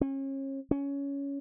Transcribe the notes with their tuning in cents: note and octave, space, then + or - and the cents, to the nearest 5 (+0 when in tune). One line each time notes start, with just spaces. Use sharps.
C#4 -35
C#4 +15